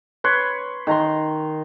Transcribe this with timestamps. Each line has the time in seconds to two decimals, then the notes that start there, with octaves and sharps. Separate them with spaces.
0.24 B4 C#5 C6
0.87 D#3 A#5 C6